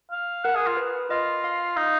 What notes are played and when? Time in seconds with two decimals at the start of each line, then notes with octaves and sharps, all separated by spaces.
0.12 F5
0.45 A#4 F#5
0.55 G#4
0.61 A#4
0.67 F4
0.77 B4
1.10 F4 D#5
1.44 F5
1.77 D#4 F5